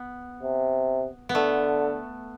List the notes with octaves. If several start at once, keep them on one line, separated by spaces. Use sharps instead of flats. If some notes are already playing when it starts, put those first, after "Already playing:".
Already playing: B3
C3
B3
D3 A3